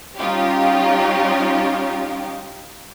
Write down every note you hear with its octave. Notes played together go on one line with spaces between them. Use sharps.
G3 C#4 D#4 F4 G4